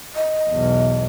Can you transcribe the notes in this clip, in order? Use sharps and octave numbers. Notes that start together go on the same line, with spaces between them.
D#5
B1 E2